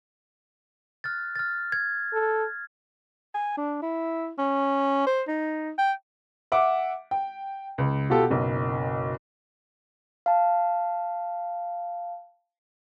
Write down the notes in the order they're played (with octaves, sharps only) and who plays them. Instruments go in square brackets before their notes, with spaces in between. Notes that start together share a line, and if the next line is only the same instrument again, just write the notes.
[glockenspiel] F6 F#6 A6
F6 A6
G#6
[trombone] A4
[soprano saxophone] G#5
D4
E4
C#4
C5
D#4
G5
[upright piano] E5 F#5 D6
G5
C#2
B2 F4 G4 A4
F#1 B1
[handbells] F5 A5